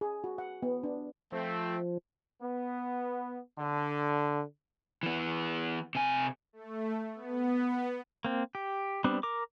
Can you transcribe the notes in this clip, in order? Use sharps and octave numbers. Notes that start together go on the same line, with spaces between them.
G#4
F#4
F#5
B3
D4
F3 A3 C4
B3
D3
E3 B3
C3 G#5
A3
B3
A#3 C4
G4
G3 B3 C4 D4
A#4 D6